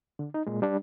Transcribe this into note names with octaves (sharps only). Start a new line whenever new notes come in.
D3
D#4
A#2 G#3
G3 D4